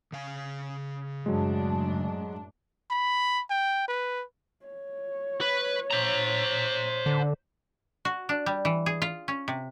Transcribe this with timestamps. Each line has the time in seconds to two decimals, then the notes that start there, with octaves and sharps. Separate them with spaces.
0.12 C#3 F5 G#5
1.26 F#2 A2 F#3 G#3 D4
2.91 B5
3.50 G5
3.88 B4
4.66 C#5
5.41 B4
5.91 C5 A#5
7.06 D3
8.05 F#4
8.29 D4
8.46 G3
8.65 E3
8.86 G#4
9.02 F4
9.28 C#4
9.48 C3